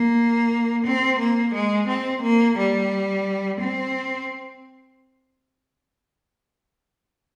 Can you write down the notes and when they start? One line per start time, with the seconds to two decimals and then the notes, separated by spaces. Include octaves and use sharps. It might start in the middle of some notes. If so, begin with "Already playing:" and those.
Already playing: A#3
0.86 C4
1.20 A#3
1.54 G#3
1.88 C4
2.23 A#3
2.58 G3
3.61 C4